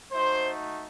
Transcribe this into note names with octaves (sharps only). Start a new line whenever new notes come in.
A3 D#4 F#4 C5